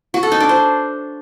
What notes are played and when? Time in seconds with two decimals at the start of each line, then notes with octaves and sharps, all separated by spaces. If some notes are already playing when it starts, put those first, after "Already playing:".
0.14 F#4
0.23 A4
0.32 D#4
0.40 D4
0.49 C5